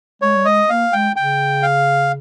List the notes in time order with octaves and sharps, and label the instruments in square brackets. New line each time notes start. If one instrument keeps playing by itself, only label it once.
[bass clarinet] G#3 [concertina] C#5
[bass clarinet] G3
[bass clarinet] G#3 [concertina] D#5
[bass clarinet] A#3 [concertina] F5
[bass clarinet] G#3 [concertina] G5
[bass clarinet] C#3 [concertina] G5
[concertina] F5